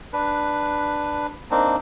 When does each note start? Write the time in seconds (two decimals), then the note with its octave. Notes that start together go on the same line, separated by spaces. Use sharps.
0.13 D4 B4
1.51 A#3 C4 D4 D#4